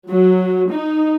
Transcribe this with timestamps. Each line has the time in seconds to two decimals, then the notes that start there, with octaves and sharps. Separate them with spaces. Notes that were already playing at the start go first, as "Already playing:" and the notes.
0.10 F#3
0.72 D#4